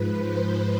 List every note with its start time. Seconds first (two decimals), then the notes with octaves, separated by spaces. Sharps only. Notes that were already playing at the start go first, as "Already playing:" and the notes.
Already playing: G#2 F3 B4
0.19 C5